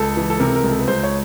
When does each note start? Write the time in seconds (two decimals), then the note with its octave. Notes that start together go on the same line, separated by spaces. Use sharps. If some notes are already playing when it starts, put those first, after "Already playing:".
Already playing: C#2 A4
0.17 E3
0.30 A4
0.40 C3 A#4
0.55 A#4
0.63 C#2
0.71 A4
0.81 B4
0.87 C#2 C5
1.03 C#5